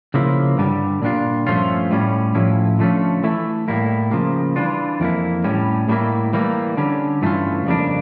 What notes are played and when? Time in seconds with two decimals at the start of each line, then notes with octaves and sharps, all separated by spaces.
0.14 C#3 F3 A#3 E4
0.58 G2 D3 G3
1.02 A#2 G3 D4 F4
1.46 G2 F3 A3 C#4 F4
1.91 A2 G3 C#4
2.35 A2 F3 C#4 E4
2.79 D3 F3 A3 C#4
3.24 E3 A3 E4
3.68 A2 G3 A#3 E4
4.11 C#3 F3 A#3
4.56 E3 G3 D4 F4
5.00 F2 E3 A#3 E4
5.44 A2 G3 C#4
5.89 A2 G3 A#3 E4
6.33 E3 G3 A#3
6.77 D3 G3 C#4
7.22 G2 E3 A3 C#4 F4
7.66 F2 C#3 G3 A#3 D4